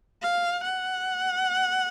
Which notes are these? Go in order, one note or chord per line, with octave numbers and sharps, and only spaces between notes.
F5
F#5